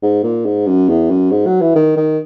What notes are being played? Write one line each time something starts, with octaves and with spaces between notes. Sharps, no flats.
G#2
A#2
G#2
F#2
E2
F#2
G#2
F#3
E3
D#3
D#3